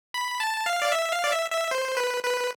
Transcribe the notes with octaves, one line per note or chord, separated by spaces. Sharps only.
B5
A5
F5
D5
E5
F5
D5
E5
E5
C5
B4
B4